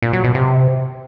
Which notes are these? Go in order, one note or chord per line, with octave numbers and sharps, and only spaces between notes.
A#2
F#3
B2
C3